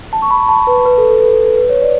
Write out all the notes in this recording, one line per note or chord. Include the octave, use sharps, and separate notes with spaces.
A5
C#6
B5
A5
B4
B4
A4
A4
B4
A4
B4
B4
C#5
D5